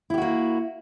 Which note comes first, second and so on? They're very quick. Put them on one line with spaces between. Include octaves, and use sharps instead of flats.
E4 G4 F#4 A#3